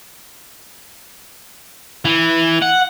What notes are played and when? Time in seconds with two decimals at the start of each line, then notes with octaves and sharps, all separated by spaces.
2.05 E3
2.62 F#5